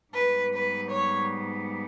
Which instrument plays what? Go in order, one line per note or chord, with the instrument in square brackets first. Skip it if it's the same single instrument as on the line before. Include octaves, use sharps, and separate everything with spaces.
[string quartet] G#2 G3 B3 B4
B4
C#5